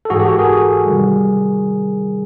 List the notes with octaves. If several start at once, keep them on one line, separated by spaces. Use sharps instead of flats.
A4
G#2 E3 G#3 F#4 G#4
G4 A4
F#4 G#4
G#4 A#4
C3 D#3 G3